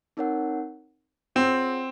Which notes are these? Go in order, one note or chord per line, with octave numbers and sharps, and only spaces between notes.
C4 D#4 A#4 C#5 F#5
C4 F4 G#4 C#5 F#5